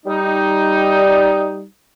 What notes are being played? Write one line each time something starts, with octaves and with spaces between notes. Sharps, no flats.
G3 D#4